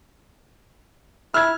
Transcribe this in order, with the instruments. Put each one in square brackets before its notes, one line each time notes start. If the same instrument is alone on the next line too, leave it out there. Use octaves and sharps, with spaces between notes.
[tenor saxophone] E4 [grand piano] E6 G#6 [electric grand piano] F6